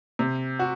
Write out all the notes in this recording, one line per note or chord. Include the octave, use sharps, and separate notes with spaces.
C3
F#4